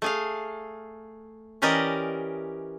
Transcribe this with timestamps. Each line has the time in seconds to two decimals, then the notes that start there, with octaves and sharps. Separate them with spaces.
0.02 A3 G#4 F5
1.62 E3 C#4 G4 A#4 D5 D#5